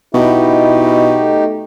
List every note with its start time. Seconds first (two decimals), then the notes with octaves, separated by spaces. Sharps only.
0.15 B2 D#4 E4 G4
1.20 A3